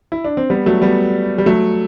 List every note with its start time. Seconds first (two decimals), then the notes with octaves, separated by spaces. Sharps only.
0.12 E4
0.24 D4
0.37 C4
0.50 G3 B3
0.66 F#3 A3
0.82 G3 B3
1.38 G3
1.46 F#3 A3